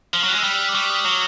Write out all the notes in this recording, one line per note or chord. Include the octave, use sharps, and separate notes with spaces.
F3 F6
F#3
G3 F#6
G#3
E6
G3 F6
E6
F6
D6
G3 C#6
D#6
F#3